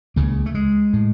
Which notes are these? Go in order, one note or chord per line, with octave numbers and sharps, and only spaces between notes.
C#2 C#3 A#3
A3
G#3
A2